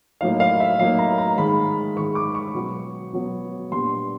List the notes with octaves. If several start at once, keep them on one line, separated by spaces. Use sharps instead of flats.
A2 F#3 A#3 D#4 F5
F5
E5
A2 F#3 A#3 D#4 F5
A#5
A#5
G#2 D#3 G#3 B5
G#2 D#3 G#3 C#6
D6
C#6
B2 F#3 B3
B2 F#3 B3
A#2 G3 B3 D4 C6